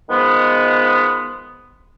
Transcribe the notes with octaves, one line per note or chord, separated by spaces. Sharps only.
D#3 F3 G#3 B3